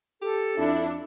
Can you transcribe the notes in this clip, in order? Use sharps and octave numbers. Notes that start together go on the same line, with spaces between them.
G4 A4
F2 D4 E4